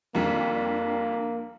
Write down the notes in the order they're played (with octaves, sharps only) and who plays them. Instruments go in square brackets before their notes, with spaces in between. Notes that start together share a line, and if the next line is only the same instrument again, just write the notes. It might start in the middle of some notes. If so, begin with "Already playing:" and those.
[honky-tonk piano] F2 D#3 G3 [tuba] A#3 [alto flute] D4